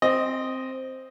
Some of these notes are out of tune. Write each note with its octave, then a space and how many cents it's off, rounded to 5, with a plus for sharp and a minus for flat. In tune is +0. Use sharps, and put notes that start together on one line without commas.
C4 +0 D#5 +0